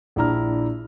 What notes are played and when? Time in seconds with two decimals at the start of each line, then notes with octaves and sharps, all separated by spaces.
0.16 A#1 D4 E4 A#5 F6